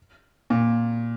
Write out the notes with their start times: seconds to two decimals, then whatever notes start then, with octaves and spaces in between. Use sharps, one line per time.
0.50 A#2